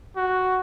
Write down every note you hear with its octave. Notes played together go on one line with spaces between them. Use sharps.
F#4